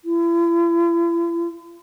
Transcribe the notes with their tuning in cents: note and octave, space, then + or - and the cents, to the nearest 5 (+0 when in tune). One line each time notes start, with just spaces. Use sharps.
E4 +45